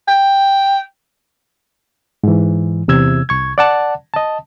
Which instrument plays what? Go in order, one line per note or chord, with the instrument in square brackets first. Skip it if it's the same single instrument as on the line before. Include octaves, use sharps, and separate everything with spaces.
[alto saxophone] G5
[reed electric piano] G#2 E3
E2 C3 E6 G#6
C2 C#6 G#6
D5 F#5 A5
D#5 A5